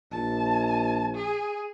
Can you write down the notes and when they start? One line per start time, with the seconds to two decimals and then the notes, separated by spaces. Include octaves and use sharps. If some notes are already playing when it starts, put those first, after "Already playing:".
0.11 A#1 A5
1.14 G#4